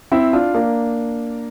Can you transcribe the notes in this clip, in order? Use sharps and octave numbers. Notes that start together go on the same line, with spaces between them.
C4 E4
D4 F4
A#3 D4